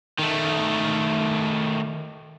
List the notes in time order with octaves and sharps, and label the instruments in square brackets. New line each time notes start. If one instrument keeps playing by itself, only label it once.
[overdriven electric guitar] D#3 A3